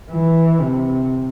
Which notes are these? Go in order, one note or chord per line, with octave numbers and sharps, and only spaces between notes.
E3
C3